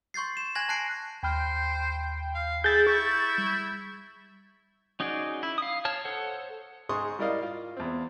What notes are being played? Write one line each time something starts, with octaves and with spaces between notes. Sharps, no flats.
C6 C#6 G6 A6 C7
E7
G#5 F#6 G#6 A#6 F#7
A5 F#6 C7 D7
D#2 C5 G5 B5 F6
F5
E4 G#4 G6 A6
E4 C#6
G3
C#4 D#4 F#4 G#4 D5
E4
F5 D#6
C#5 A5 F6
A4 C5 C#5 F#5
G#2 G#3 C6 C#6 D#6
G3 E4 A#4 D5 D#5 F5
F4
E2 C4